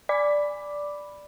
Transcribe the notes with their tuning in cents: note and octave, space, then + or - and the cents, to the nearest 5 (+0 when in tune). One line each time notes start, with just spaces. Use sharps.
D5 +0 B5 +0 D6 +0